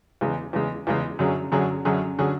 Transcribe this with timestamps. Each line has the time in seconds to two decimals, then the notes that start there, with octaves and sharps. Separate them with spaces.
0.21 E2 C#3 G#3
0.53 E2 C#3 G#3
0.87 E2 C#3 G#3
1.19 F#2 D3 F#3 C#4 G#4
1.52 F#2 D3 F#3 C#4 G#4
1.85 F#2 D3 F#3 C#4 G#4
2.19 D3 F#3 C#4 G#4